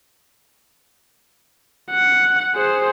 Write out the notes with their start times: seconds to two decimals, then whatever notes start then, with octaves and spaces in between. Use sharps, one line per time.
1.91 F#5
2.55 G#4 C5